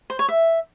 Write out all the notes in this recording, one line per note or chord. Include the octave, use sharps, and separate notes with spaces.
C5
C#5
E5